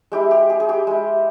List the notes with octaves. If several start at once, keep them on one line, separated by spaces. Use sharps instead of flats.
G#3 E4 G4
G4
G#4
G#4
G4
G#3 E4